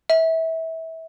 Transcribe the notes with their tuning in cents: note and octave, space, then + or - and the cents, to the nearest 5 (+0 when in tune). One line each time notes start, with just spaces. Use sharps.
E5 -25